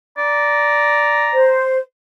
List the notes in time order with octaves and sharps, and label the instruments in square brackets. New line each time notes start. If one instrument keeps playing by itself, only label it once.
[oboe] D5 [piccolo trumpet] A#5
[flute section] C5